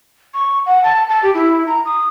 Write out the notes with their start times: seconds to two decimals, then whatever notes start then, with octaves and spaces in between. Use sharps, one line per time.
0.34 C#6
0.66 F#5
0.84 A5
1.10 A5
1.23 G4
1.34 E4
1.67 A#5
1.85 D#6